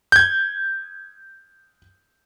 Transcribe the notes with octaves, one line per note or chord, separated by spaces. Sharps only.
G6 G#6